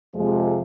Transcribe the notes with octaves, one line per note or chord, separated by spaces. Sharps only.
F2 C3 F3 G#3